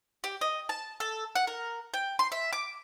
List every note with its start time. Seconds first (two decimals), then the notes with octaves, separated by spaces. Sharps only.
0.24 G4
0.41 D#5
0.69 A5
1.00 A4
1.35 F#5
1.47 A#4
1.94 G5
2.19 C6
2.32 E5
2.53 D6